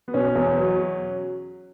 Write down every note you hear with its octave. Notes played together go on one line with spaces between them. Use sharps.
B3
B2 C#4
E2
F#3